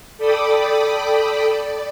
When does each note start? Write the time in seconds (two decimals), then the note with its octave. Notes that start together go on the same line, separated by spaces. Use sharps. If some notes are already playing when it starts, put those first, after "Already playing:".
0.18 A4 D5 G5 B5 D6 D#6
1.52 D5